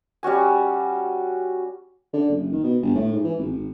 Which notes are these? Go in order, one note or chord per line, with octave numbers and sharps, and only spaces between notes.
G3 C#4 F#4 G#5
D3
F#1
D#3
B2
G1
A2
G#2
E3
G#1
G#1